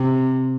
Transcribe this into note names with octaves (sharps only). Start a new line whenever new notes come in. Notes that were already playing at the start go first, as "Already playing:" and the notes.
Already playing: C3